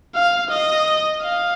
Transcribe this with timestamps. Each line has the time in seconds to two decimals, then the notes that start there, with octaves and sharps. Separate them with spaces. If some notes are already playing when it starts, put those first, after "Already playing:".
0.14 F5
0.50 D#5
1.22 F5